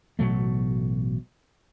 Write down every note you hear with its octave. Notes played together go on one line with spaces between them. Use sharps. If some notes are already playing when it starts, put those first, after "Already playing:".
A1 B2 F#3 A3